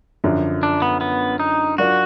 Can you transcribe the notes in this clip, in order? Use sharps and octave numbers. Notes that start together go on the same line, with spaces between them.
F#2 D3 F3
D4
B3
B3
D#4
F#3 D4 F4 F#4 A#4 D5